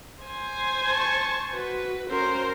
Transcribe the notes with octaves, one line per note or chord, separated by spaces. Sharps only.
C5 G#5
A5 C#6
F#4 B4
C#4 F#4 A#4 C5